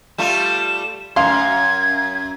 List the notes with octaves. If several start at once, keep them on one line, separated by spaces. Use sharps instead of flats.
G3 A3 F4 E7
F#2 F5 C6 G#6